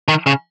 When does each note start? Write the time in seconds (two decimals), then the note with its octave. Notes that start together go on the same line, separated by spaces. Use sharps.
0.08 D#3
0.26 C#3